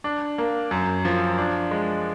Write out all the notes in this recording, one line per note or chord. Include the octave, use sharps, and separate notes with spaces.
D4
A#3
F#2
F3
D4
G#3